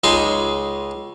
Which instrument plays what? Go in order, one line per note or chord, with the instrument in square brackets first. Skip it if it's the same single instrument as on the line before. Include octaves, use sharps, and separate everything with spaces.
[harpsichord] C#2 G#3 D#4 C6